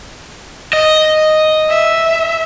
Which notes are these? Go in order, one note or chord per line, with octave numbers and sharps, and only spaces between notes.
D#5
E5